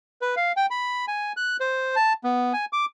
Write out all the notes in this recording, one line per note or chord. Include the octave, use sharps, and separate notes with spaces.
B4
F5
G5
B5
G#5
F#6
C5
A5
B3
G#5
D6